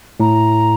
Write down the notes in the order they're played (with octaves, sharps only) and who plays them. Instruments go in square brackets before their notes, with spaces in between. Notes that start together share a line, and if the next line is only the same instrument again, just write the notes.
[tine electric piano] A2 [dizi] A#5